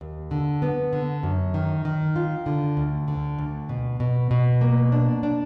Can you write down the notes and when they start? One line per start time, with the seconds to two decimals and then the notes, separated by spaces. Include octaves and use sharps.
0.01 D#2
0.31 D3
0.62 B3
0.93 D3
1.23 F#2
1.54 D#3
1.85 D#3
2.16 F4
2.46 D3
2.77 D2
3.08 D3
3.39 D2
3.69 B2
4.00 B2
4.31 B2
4.61 A#3
4.92 D4
5.23 D4